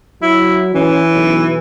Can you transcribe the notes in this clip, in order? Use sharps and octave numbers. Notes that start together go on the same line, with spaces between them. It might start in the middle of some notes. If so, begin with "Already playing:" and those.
F#3 E4
E3 C#4
B1